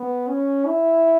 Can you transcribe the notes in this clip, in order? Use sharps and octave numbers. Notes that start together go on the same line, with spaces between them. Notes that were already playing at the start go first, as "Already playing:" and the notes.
Already playing: B3
C#4
E4